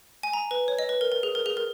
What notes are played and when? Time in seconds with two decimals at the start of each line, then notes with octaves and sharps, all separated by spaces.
0.23 G#5
0.33 A#5
0.51 B4
0.68 C#5
0.79 D#5
0.89 B4
1.01 A#4
1.12 A#4
1.23 G#4
1.35 A#4
1.46 G#4
1.57 A#4